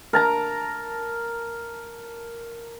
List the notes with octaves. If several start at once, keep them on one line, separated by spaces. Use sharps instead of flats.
A#4 A5 A#5